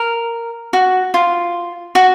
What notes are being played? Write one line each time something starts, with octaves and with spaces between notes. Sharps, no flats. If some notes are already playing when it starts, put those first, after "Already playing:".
Already playing: A#4
F#4
F4
F#4